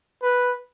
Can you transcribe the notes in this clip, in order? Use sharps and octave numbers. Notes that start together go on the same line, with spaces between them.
B4